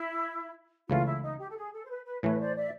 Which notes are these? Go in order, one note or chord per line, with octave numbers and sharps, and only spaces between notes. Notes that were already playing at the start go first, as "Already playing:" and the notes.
Already playing: E4
C#2 C#3 E3 A3 F4
E4
D#4
G4
A4
G#4
A4
C5
B4
B4
A2 E3 A3 B4 C#5
C#5
C5 D5
D5 E5